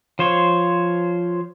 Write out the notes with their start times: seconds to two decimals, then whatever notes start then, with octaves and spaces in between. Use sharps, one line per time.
0.19 F3 C5 C#5